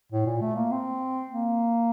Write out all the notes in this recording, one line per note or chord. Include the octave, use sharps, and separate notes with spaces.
A2
A#2
A3
A#3
C4
A#3